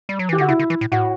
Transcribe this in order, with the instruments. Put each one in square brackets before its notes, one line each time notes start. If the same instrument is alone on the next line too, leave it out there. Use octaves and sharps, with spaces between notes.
[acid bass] G3
F#3
[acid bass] E3 [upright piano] G4
[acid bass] D3 [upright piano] F#4
[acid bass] C#3 [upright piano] E4
[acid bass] D3
E3
A2
[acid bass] A2 [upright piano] F#4